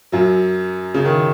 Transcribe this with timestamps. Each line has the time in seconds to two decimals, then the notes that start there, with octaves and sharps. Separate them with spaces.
0.12 F#2 F#3
0.94 C#3
1.05 D#3